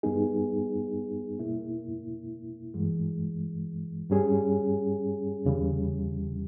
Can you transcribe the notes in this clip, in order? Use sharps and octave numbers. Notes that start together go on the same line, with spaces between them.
G2 G3 B3 D#4 G#4
B2 A#3 E4
G2 E3 G#3
G2 G3 C#4 G#4
E2 C#3 G3